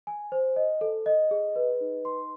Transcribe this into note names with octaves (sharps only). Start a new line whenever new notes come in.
G#5
C5
D#5
A4
D#5
G#4
B4
D#4
C6